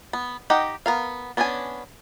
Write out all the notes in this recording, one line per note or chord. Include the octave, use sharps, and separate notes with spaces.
B3
D#4 G4 D#5 F#5 G5
B3 A#4 F5
B3 C#4 D4 G5 G#5